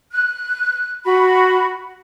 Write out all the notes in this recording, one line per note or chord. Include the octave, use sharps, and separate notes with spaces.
F#6
F#4 B5